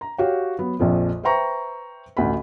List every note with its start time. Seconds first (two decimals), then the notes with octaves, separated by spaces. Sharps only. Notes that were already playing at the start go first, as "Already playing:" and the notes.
0.01 A#5
0.18 F#4 G4 C#5 F5 G5
0.58 F#3 B3
0.79 A#1 F2 F3
1.23 B4 C5 E5 G5 A#5 C#6
2.17 A1 D2 B5